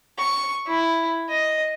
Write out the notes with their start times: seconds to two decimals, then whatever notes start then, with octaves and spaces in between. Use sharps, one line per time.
0.19 C#6
0.67 E4
1.29 D#5